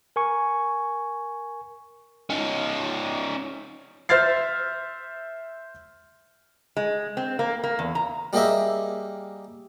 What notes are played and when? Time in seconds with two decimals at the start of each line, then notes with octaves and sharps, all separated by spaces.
0.16 A#4 G#5 C#6
2.30 C#4 D#4
4.09 C5 E5 F6 A6 C7
6.77 G#3
7.17 C4
7.39 A#3
7.64 A#3
7.79 E2
7.95 A#5
8.33 G3 A#3 G4 G#4 D#5 E5